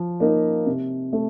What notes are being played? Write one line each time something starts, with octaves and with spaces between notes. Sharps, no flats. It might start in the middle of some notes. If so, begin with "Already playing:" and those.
Already playing: F3
A#3 D#4
C3
A3